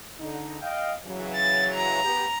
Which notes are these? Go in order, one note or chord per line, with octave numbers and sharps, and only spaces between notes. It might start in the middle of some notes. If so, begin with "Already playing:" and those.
D3 D#4
D#5 F5 G5
C#3 E3 F#3
A6
A#5
B3 G4